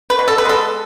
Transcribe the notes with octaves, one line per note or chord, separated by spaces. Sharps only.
B4
B2
A4
B4
G#3 A4